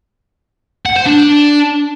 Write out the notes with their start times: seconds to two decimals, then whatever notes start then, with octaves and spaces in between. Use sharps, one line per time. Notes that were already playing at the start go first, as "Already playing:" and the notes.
0.86 F#5
0.96 C5
1.07 D4